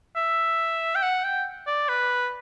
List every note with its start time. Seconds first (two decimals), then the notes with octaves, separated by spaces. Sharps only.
0.16 E5
0.95 G5
1.02 F#5
1.24 G5
1.67 D5
1.89 B4